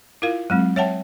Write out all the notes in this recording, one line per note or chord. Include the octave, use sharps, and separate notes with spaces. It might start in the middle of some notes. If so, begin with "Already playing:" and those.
E4 F4 A#4 F5
F#3 G#3 C4
C#5 E5 F#5 G5 A5